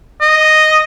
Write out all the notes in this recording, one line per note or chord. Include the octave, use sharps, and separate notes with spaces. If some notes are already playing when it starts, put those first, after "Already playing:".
D#5